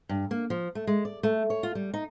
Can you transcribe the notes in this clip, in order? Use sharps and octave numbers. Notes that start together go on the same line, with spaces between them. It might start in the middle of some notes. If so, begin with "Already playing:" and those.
G2
A#3
F3
A3
G#3
D5
A3
C#5
F4
G3
D#4